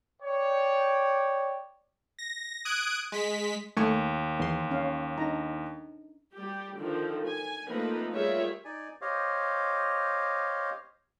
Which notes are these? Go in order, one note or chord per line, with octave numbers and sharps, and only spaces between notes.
C#5 D5 G5
A#6
D#6 F#6 G#6 D7
G#3 B6
D#2 A3 G#5 C#6
E2 C6
C#4 F5
D4 D#4 A#5
G3 G4
D3 D#3 F3
G#5
F3 A3 A#3 C4 D#4 B4
G3 F4 G#4 A#4 C#5 E5
D#4 D5 G#5
G4 C5 C#5 D#5 F5